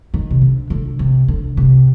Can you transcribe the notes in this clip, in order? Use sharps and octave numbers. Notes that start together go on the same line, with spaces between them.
D#3
C3
D3
D3
C3
D3
C3